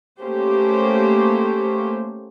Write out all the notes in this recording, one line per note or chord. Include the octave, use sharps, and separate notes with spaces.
A3 A#3 C#4 G4 C5